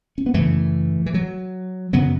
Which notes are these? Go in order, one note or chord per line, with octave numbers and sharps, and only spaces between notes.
C#4
B3
F#2 C#3 E3 A3
E3
F#3
F#2 C#3 F#3 B3